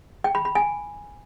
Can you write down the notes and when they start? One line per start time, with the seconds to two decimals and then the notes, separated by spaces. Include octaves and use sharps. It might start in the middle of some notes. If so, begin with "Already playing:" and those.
0.24 G5
0.35 B5
0.45 B5
0.55 G#5